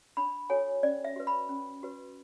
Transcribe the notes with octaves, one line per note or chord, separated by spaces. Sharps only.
D4 B5
F#4 A4 C#5 G#5
C#4 D5
E5
F#4 B4
B5
C#4
F#4 B4